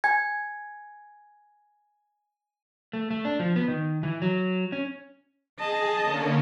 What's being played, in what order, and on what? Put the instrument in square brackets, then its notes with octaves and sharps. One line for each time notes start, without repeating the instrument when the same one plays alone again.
[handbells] G#5 G#6
[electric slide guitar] A3
A3
D4
F3
B3
D#3
E3
F#3
C#4
[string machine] G#4 [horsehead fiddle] D#5 A5
[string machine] D3 A#3 C#4